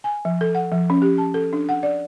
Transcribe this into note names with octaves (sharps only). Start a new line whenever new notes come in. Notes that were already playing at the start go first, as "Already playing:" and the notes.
G#5
F3
A4
F#5
F3
C#4
G4
A5
A4
D4
F#5
D5